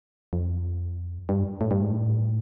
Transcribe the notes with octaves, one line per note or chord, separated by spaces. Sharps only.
F2
G2
A2
G2
G#2
A2